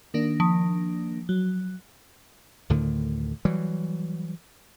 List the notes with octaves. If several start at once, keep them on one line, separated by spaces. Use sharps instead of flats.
D#3 A#3 D4
F3
F#3
D2 A2 D3 D#3
E3 F#3 G3